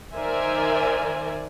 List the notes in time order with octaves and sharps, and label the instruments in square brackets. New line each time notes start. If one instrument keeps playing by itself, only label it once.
[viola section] D#3 A#4 C5 D5 E5 G#5